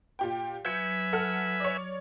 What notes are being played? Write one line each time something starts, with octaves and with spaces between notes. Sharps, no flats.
A#2 G4 G5
F#3 B4 E5 G#5 G6 G#6 C#7
A4 F#5 F6
C#5 D5